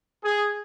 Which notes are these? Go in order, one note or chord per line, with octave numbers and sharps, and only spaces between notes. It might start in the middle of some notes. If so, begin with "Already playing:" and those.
G#4